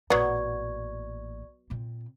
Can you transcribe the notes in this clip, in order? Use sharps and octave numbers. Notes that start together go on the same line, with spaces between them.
A1 A#2 F#3 B3 D5 C#6 G#6
A#2 C4